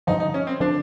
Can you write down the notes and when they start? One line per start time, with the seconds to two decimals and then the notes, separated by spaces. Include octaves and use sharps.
0.07 G2 D3 F3 D#4
0.20 D#4
0.34 C#4
0.47 C4
0.60 D3 F3 D4